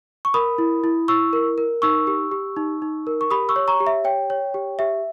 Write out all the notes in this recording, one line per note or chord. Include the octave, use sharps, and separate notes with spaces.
C#6
A#4 B5 D#6
E4
E4
E4 C#6 E6
A#4
A#4
D#4 C#6 E6
G4
G4
D#4
D#4
A#4
C#6
G4 B5 D#6
C#6 E6
C#5
A#5 C#6
G4
E5
C#5 G5
C#5
G4
G4 E5